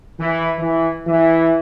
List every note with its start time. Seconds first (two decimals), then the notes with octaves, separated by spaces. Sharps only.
0.19 E3
0.59 E3
1.07 E3